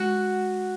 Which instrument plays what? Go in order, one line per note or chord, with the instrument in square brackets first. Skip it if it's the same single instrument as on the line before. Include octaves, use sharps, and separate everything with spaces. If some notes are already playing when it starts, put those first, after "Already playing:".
Already playing: [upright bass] G#3 [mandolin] F#4